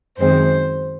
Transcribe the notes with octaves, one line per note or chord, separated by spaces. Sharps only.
F#2 D#3 G#3 C4 C5